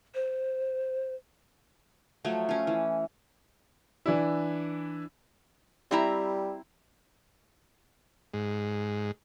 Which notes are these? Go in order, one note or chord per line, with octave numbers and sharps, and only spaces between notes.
C5
F3 F#3 A3 C#5
C#4 F4
E3
E3 D4 E4
G3 C4 E4 A#5
G#2